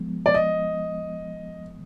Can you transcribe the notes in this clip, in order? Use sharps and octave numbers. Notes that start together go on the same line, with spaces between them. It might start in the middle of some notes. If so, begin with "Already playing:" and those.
Already playing: F3 G#3 B3
D5
D#5